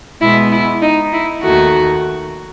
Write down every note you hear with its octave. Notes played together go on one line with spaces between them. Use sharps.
B2 G#3 B3 E4
E4
D#4
E4
D#2 D#3 A3 F#4